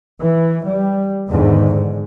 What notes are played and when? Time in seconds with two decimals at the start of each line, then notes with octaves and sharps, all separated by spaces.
0.19 E3
0.66 G3
1.29 E2 G#2 D3 D#3
1.72 G#2